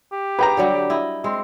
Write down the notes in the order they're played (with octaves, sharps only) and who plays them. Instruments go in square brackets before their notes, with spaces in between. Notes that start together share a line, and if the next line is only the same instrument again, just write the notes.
[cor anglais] G4
[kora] G#4 [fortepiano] B4 G5 A#5
[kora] D3 F#3 G3
E4 D#5
[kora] G#3 [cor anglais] C4